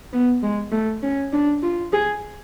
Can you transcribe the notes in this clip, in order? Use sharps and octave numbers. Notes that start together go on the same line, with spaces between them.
B3
G#3
A3
C#4
D4
F4
G#4